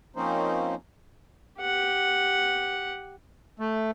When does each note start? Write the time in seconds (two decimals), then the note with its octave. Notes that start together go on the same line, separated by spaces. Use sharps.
0.16 F3 A#3 C4 C#4 D#4 C5
1.60 G4 F#5
3.59 A3